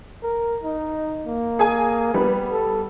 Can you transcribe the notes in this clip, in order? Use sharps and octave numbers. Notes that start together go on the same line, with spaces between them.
A#4
D#4
A#3
G#4 G#5
G3 B3 B4
A4